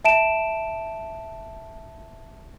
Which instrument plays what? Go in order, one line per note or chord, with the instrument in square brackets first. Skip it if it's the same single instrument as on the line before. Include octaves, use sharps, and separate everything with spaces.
[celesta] E5 A5 D7 E7